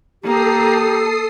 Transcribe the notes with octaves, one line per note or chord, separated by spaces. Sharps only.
A#3 G4 A4 A#5 D#6 C7